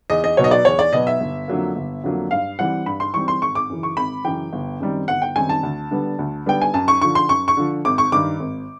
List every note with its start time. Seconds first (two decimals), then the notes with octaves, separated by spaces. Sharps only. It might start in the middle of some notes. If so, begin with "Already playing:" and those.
0.10 E2 D#5
0.24 D#5
0.37 B2 F#3 B3 C#5
0.44 D#5
0.51 D5
0.65 E2 C#5
0.79 D5
0.93 B2 F#3 B3 D#5
1.07 E5
1.20 G1
1.48 F2 D3 F#3 A#3
1.76 G1
2.04 F2 D3 F#3 A#3
2.31 G2 F5
2.59 E3 G3 C4 F#5
2.86 G2 B5
3.00 C6
3.14 E3 G3 C4 C#6
3.28 C6
3.42 G#1 C#6
3.55 D6
3.69 F#2 C#3 E3
3.83 C#6
3.97 G#1 B5
4.25 F#2 C#3 E3 G5
4.53 G1
4.80 F#2 D#3 G3 C4
5.08 G1 F#5
5.22 G5
5.35 F#2 D#3 G3 C4 G#5
5.49 A5
5.63 D2
5.91 D3 G3 B3
6.19 D2
6.46 D3 G3 B3 G5
6.62 G#5
6.74 F#2 A5
6.88 C#6
7.01 D3 F3 C#6
7.15 C6
7.29 F#2 C#6
7.48 C#6
7.57 D3 F3
7.85 G#1 D6
7.98 C#6
8.12 G2 D#3 D6
8.40 G#1